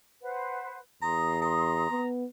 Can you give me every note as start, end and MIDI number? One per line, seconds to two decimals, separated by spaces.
0.22 0.78 71
0.22 0.78 72
0.22 0.78 78
1.02 1.88 40
1.02 1.37 82
1.02 1.99 84
1.02 1.99 87
1.42 2.06 82
1.90 2.25 59